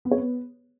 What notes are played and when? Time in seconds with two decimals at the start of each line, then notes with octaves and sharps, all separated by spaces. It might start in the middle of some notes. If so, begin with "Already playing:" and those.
0.05 B3
0.11 C#5
0.18 B3